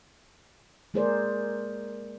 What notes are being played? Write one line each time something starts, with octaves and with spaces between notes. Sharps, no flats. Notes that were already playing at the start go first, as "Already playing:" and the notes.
G#3 A#3 G#4 A#4 C5 D5